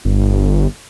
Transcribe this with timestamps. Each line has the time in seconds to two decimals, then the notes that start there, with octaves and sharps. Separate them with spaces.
0.05 G1